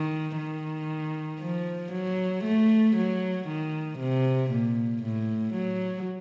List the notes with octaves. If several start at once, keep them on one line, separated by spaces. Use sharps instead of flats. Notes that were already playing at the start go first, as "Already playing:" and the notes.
Already playing: D#3
D#3
F3
F#3
A3
F#3
D#3
C3
A#2
A2
F#3